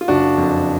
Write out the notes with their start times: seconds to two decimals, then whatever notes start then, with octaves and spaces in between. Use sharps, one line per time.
0.01 F4
0.08 F#1 D4 F#4
0.38 F2